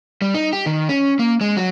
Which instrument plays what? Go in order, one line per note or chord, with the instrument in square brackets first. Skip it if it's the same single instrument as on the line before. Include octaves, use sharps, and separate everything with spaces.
[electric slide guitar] G3
D#4
G4
D#3
C#4
A#3
G#3
F#3